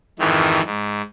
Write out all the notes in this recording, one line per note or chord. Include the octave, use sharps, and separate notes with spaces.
F2 G#2 D#3 E3
G#2